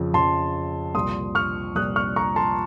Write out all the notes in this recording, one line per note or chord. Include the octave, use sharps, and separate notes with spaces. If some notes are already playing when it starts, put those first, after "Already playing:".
Already playing: F2 C#3 F3
F2 C#3 F3 A5 C6
C2 A#2 F3 C6 D#6
C#6 F6
C2 A#2 F3 D#6 F#6
C#6 F6
A#5 C#6
A5 C6